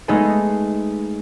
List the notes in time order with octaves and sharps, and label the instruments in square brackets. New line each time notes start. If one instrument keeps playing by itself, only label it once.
[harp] G#3 A3 B3 D#4 G#4 A4